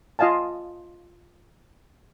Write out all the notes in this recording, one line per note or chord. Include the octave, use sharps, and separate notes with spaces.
F4 D#5 F5 G#5 A5